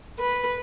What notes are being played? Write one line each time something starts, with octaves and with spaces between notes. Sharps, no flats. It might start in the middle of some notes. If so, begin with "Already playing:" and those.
B4